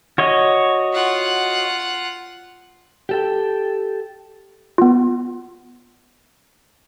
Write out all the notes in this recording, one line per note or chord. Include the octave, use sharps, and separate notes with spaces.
F#4 C#5 D#5
F4 F#5
G4 A4 G5
B3 F4